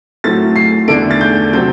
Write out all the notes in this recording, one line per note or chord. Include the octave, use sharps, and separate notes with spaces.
A2 F#3 A3 C4 A6
C7
E2 D3 A3 D4 D7
A6
G6
C3 F#3 C4 G6